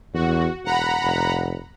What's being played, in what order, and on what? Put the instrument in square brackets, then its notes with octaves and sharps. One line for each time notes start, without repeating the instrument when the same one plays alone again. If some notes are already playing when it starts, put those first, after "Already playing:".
[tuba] E2 [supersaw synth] F#4
[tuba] E1 [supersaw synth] F#5 A#5 B5
[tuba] F1